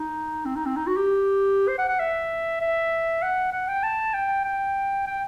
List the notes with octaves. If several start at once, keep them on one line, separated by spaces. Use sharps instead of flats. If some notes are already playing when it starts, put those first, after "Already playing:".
Already playing: D#4
C4
D#4
C4
D#4
F#4
G4
C5
F#5
F#5
E5
E5
F#5
F#5
G5
A5
G5
G5
G5